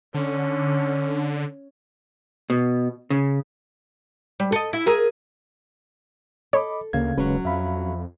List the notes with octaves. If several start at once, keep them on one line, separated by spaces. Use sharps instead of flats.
D3 C#4
B2
C#3
G3
A4 D#5
E4
G#4 A#4 E5
A4 C#5 D#5 B5 D6
D2 C#3 A#3 F5 G#6
D#1 C#3 F#3 G#3 C#4 B4
F2 E5 F5 B5